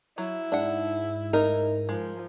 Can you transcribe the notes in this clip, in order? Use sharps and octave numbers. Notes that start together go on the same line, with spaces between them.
F#3 E4
G#2 D4 F#5
D#4 A#4
F3 G#3